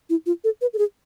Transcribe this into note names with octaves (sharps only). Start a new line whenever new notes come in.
E4
F4
A4
B4
A4
G#4